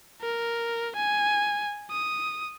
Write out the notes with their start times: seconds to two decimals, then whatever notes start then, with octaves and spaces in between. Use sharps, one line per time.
0.22 A#4
0.96 G#5
1.91 D#6